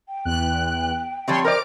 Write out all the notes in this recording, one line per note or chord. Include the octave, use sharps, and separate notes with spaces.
G5
E2 F#6
F3 G3 C4 C#5 C6
A#4 C5 D5 D6 F6 D7